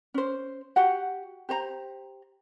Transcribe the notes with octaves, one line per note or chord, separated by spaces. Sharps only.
C#4 C5
F#4 G4 F#5
G4 C5 A#5